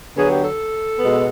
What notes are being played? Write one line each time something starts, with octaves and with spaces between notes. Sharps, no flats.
D3 F#3 B3 G#4
G4
A4
B2 G#3 B3